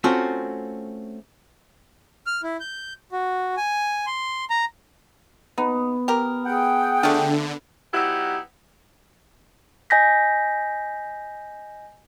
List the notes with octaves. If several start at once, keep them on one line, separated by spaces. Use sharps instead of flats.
A3 C4 C#4 F4 F#4
F6
E4
G6
F#4
G#5
C6
A#5
B3 D#4
G4 A#4
G#4 F#5 G5
D3 F3 A3 D5
F#3 B3 D#4 E4 G4 F#5
D#5 G#5 G6 A#6 B6